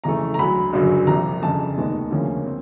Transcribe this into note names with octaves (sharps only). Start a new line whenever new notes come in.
F2 C#3 E3 A3 A#5
A#5
D2 D3 F#3 B5
G1 F#2 C#3 F#3
C2 C3 F3 A#5
G1 F2 C#3 A5
F1 D#2 D#3 G#3 B3
D2 C#3 F3 A#3 C#4
C4